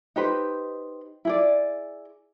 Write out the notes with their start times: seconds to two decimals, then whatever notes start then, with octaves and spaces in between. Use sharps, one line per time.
0.16 D#4 G4 B4 C5
1.25 E4 G#4 D5